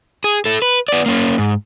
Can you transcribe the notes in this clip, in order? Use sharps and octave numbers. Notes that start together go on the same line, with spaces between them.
G#4
E4 A4
B4
B3 D5
A#3 C#4
G#2